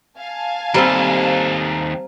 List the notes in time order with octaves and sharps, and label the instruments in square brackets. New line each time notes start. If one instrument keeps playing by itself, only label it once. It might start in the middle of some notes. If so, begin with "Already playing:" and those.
[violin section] F5 G#5 A5
[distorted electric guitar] D#2 A4 [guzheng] G3 C4 [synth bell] C5 A#5